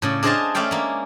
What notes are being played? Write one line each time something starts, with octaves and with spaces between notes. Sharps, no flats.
A2 C#3 D5
D4 G#4 C5 D#5 F5 A5
A3 C#4 D5 E5 F5 G5
G#3 A#3